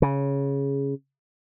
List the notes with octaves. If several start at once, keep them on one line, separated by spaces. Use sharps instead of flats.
C#3